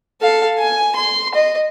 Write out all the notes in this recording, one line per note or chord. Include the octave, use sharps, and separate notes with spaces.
A4 F5
G#5
C6
D#5